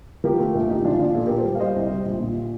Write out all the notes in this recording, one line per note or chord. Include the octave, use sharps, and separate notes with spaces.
F3 G4 A#4
A3
A#1
A#2 D#4 G4
F3 D4 F4
A#1 D4 F4
A#2 F4 A4
G4 A#4
A#2
A4 C5
G3
F5
G3 C5 D#5
C2
G3
A#1
A#2